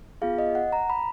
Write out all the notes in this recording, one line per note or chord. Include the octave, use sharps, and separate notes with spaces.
B3 F4 G#4 F5
D#5
F#5
A#5
B5